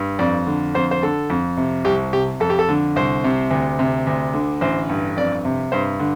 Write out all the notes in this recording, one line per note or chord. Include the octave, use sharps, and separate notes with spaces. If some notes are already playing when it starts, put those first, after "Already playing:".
Already playing: G2
F2 D5
D3
F2 C5
C5
D3 A4
F2
C3
C2 G4
C3 G4
F2 A4
G4
A4
D3
C2 C5
C3
D2
C3
D2
D3
A1 C5
G2
F2 D5
C3
G2 C5
D3